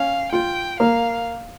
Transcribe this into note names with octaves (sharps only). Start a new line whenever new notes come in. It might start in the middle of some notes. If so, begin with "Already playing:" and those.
Already playing: C#4 F5
F4 G5
A#3 F5